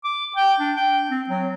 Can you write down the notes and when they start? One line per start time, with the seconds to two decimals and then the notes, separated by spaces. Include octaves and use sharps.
0.04 D6
0.36 G5
0.60 D4
0.76 G5
1.10 C4
1.29 F#3